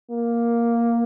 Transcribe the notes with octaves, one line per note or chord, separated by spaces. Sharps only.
A#3